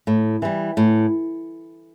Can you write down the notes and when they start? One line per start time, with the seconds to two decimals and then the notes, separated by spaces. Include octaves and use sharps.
0.07 A2
0.42 E3 G3
0.77 A2